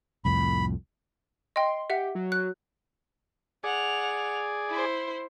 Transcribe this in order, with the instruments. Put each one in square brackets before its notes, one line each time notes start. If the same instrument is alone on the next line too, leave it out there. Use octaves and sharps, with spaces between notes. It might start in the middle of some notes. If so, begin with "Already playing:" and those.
[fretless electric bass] C2 F2 A2 [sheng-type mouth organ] B5
[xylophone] D#5 G5 [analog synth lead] C6
[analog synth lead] G4 [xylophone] E5 F#5
[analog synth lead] F#3
[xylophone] F#6
[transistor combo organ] G#4 D5 [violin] F#5 F7
[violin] E4 C5